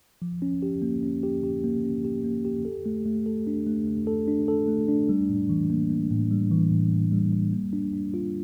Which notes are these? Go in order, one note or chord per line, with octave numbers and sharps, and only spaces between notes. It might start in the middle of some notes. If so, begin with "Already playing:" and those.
F3
C#4
G4
A#3
C#4
G4
G4
A#3
C#4
G4
A#3
G4
A4
A3
A3
A4
D4
A3
A3
A4
D4
A4
A3
D4
G3
A2
E3
A#3
A#3
A2
G3
E3
A2
A2
G3
G3
A#3
D4
D4
F4